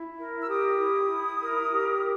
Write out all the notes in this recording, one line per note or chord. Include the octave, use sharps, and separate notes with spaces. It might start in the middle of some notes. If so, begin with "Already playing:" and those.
Already playing: E4
A#4
E6
G4 D#6
E4
E4
A#4
G4